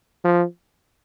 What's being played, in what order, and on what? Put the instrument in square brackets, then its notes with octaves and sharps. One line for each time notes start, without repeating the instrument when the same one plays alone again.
[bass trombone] F3